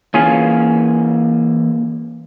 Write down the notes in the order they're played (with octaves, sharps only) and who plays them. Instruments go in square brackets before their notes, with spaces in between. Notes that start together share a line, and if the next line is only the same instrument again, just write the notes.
[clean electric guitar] E3 A#3 [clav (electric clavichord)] C#4 F4 G#4